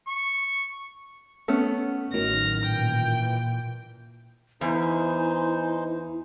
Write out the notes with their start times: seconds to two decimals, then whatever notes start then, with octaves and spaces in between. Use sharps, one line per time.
0.07 C#6
1.48 A3 B3 C#4
2.14 A1 A2 D#3 F#3 F6 A#6
2.66 A#2 E3 G5
4.61 E2 D#4 E4 C5 G#5